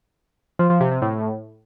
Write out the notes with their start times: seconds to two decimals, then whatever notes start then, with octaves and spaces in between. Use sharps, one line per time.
0.59 F3
0.70 F3
0.80 C3
0.91 C3
1.02 A2